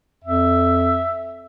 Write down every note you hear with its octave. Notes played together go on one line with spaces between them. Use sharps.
F2 E5